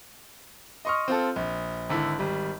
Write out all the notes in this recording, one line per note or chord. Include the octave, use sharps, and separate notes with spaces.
D#5 C6 C#6 D#6 F6
C4 F4 A4
A#1
G#1 D3 E4
G#1 G3